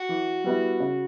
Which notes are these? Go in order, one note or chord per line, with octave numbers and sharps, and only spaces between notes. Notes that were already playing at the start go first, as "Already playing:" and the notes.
Already playing: F#4
E3
G3 B3 E4
C#3